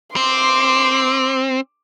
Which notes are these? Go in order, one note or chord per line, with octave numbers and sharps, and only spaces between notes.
C4 C6 D6